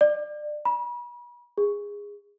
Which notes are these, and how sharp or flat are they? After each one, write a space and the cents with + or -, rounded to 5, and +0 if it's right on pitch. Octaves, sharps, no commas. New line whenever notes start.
D5 +25
B5 -40
G#4 -20